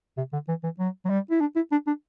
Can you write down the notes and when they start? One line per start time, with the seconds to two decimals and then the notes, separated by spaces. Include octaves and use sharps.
0.17 C3
0.33 D3
0.49 E3
0.64 E3
0.79 F#3
1.05 F#3
1.10 G3
1.31 E4
1.40 D4
1.56 E4
1.72 D4
1.87 D4